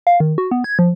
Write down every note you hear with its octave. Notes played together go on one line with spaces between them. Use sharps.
F5
D#3
F#4
B3
G#6
F3